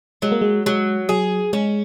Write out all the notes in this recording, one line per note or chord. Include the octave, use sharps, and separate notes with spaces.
F#3 G#3
A#3
G#3
F#3 G#3
F#3 G#4
G#3 C#4